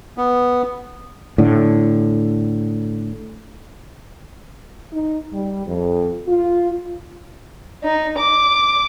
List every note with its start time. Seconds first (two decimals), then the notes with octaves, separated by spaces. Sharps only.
0.18 B3
1.38 A2 D3
4.93 D#4
5.33 G3
5.67 F2
6.28 F4
7.84 D#4
8.18 D6